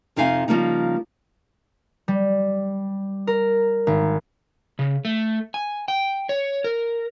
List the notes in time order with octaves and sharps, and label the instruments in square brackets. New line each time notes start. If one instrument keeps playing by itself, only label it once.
[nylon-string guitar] F2 C3 D#4 F5 G#5
C#3 F3 G3 A#3 D#4
[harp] G3
A#4
G#1
[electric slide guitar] C#3
A3
G#5
G5
C#5
A#4